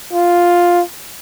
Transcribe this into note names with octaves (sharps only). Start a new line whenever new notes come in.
F4